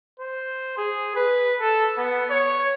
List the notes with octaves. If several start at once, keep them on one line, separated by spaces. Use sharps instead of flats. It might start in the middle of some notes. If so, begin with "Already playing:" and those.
C5
G#4
B4
A4
B3
C#5